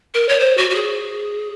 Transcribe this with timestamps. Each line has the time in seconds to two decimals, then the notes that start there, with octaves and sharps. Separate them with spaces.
0.14 A#4
0.29 C#5
0.40 C5
0.57 F#4
0.71 F#4
0.75 G#4